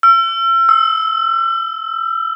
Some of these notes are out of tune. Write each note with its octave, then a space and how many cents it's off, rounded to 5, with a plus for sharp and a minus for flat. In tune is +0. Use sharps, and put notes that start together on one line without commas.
E6 +40
E6 -15